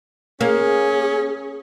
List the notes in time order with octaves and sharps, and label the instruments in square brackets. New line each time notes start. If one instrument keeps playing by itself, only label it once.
[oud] A#3 [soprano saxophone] C#4 [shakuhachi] G#4